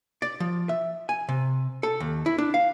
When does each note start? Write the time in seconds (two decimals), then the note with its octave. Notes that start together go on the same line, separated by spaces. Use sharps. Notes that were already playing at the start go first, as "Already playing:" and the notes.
0.22 D5
0.40 F3
0.69 E5
1.09 G#5
1.29 C3
1.83 A4
2.00 D#2
2.26 E4
2.38 D4
2.54 F5